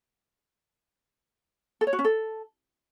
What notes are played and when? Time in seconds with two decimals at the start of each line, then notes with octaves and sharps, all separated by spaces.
1.81 A4
1.87 C#5
1.93 F#4
1.99 C#4
2.04 A4